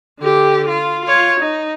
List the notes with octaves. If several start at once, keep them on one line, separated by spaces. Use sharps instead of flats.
D3 G4
F4
F4 C#5
D#4